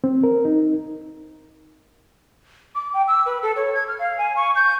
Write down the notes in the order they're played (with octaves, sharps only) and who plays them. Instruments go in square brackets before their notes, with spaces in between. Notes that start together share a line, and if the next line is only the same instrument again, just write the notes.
[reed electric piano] C4
A#4
D#4
[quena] D6
G5
E6
B4
A4
C#5
G#6
F6
F5
G#5
C#6
G6